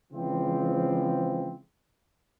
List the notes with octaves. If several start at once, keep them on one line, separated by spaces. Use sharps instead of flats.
C#3 E3 F3 G#3 C4